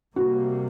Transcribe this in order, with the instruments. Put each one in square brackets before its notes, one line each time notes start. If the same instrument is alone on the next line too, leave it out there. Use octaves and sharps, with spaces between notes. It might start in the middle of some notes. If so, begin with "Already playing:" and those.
[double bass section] C3 G3 A#3 [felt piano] F#4